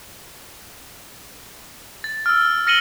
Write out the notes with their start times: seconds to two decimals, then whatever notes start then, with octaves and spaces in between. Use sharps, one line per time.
2.04 A6
2.26 E6 F6
2.67 F6 A#6 C#7 D#7 F#7 G7